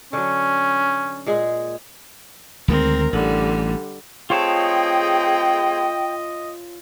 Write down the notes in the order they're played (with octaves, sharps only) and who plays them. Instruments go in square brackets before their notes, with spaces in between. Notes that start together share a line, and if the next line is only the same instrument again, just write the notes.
[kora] D3 F#3 [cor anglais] C#4
[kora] A#2 G#3 G#4
[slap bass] D2 D#3 G#3 [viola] C4 A#4
[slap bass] A1 [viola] D3 G3
[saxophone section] A3 C4 G#4 [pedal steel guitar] F4 C#5 A5 [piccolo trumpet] D#5 [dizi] G5